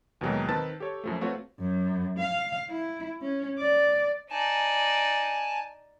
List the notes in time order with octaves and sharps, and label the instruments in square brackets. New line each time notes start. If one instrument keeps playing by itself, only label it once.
[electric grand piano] D#2 B2 E3 F#3 G#3 A#3
D#3 C4 B4 A5 E6 A6
G4 A4 C#5
F#2 F3 A3
A3 C4 F4 F#4 B4 C#5
[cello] F#2
F5
E4
C#4
D5
[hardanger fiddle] D#4 D5 [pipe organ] G#5 A5